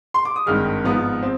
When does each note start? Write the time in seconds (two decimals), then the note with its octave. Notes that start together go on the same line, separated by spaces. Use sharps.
0.14 C6
0.25 D6
0.36 D#6
0.46 G#1 G2 D#3 G#3 F6
0.84 G#2 F3 B3
1.23 C4